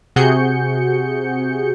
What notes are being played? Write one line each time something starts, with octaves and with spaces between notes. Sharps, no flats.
C3 F#4 G#4 G6 C#7